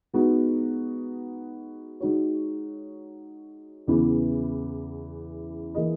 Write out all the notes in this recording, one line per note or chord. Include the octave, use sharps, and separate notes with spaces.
G#3 B3 D#4 F#4
G#3 D#4 F#4 C#5
E2 C#3 E3 B3 E4
E3 A#3 E4 G#4 D#5